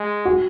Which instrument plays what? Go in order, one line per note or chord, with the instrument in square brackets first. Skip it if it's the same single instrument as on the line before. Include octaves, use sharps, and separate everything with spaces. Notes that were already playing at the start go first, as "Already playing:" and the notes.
Already playing: [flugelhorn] G#3
[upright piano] F#4